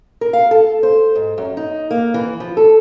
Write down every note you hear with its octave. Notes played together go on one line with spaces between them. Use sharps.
A#4
F5
A4
C5
G#2
F#2
D#4
A#3
E3
F3
A4